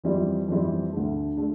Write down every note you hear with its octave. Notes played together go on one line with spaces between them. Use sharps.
F2 E3 G3 C4 E4
F2 E3 G3 C4 E4
D2 D3 A3
D3 A3